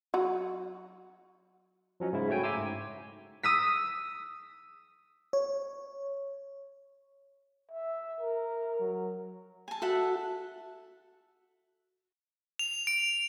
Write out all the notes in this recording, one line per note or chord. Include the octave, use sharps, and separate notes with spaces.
F#3 F#4
F3 F#3 C#4 D#5
G#2 C#3 E4
A3 F#4 C#5 G5 G#5
E5 G#5 A#5 C6 D6 E6
G#2
D#6 E6 B6
C#5
E5
A#4
F#3
G#5 A5
F#4 A4 E5 F#5
F7
D7